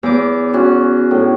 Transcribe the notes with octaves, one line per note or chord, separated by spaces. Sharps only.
E2 D6
C#4 F#4
A2